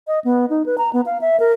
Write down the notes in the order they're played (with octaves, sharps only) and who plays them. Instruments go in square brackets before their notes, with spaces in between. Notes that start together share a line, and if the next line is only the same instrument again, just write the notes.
[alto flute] D#5
B3
D#4
B4
A#5
B3
F5
E5
A#4